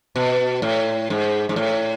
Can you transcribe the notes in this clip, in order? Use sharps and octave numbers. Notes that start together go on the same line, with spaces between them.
B2
A2
G#2
G#2
A2